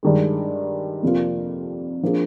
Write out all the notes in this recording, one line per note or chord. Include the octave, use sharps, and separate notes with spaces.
G2 D#3 G#3
F2 C3 F3 A#3 F4
F3 A#3 D4 G#4